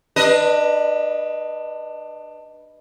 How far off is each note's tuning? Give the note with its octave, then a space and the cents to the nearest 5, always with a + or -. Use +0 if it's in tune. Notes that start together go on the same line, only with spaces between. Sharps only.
D4 +25 B4 -15 D#5 +0